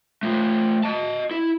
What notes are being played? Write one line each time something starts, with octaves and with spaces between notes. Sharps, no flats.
A3 F4
D#5 A5
E4